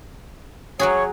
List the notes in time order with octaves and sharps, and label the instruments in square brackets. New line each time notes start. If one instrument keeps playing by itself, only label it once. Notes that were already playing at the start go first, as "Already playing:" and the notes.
[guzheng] F#3 F#4 G#4 [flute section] C#5